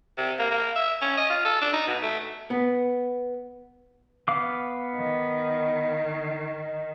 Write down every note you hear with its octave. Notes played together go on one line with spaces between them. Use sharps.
C3
A#3
A#3
E5
C#4
D#5
F4
A4
D4
D#4
B2
A3
B3
B3 F5 D6
D#3